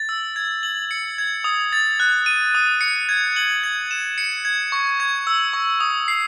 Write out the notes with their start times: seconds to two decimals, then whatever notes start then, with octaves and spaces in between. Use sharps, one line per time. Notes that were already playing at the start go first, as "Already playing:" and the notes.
Already playing: A6
0.09 E6
0.36 G#6
0.63 F#7
0.91 C#7
1.18 G#6
1.44 D#6
1.73 A6
2.00 F#6
2.26 D#7
2.55 D#6
2.81 C#7
3.09 G#6
3.36 F#7
3.64 G#6
3.91 E7
4.18 C#7
4.45 G#6
4.72 C#6
5.00 G#6
5.27 E6
5.53 C#6
5.81 D#6
6.08 C7